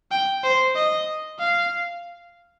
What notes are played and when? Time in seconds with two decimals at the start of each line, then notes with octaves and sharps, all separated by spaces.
0.11 G5
0.44 C5
0.75 D#5
1.39 F5